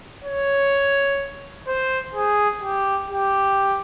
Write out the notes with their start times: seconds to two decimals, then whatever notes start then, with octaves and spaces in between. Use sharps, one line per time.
0.24 C#5
1.67 C5
2.15 G#4
2.63 G4
3.10 G4